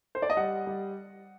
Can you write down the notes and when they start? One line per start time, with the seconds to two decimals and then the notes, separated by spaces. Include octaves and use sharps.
0.15 C5
0.22 D5
0.30 D#5
0.37 G3 F#5
0.67 G3